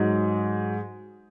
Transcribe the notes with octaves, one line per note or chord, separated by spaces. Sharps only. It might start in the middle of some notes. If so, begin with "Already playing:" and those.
Already playing: G#2 F#3 D#4